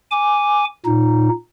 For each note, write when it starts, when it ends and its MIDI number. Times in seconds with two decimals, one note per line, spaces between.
0.11 0.65 80
0.11 0.65 86
0.85 1.29 46
0.85 1.29 63